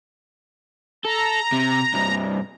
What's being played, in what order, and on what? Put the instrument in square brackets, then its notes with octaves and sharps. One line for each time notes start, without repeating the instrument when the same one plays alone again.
[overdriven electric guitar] A4 [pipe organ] A#5
[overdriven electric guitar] C3
C2 G2